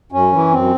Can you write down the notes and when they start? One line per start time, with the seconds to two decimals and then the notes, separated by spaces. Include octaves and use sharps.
0.12 F#2 C#4
0.33 E3
0.52 F#2 C4